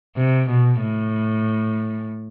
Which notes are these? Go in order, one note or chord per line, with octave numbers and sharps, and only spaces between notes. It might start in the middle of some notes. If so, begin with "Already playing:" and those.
C3
B2
A2